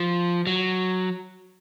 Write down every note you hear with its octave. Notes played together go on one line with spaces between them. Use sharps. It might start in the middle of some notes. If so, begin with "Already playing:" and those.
Already playing: F3
F#3